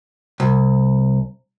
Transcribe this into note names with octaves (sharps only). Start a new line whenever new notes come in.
C2